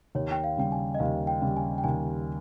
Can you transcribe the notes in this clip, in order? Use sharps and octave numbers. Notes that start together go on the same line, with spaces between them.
D#2 C#5
G5
F5
C#3 G3 G5
G#5
D#5
D#2 F5
G5
C#3 G3
G#5
G5
D#2 G#5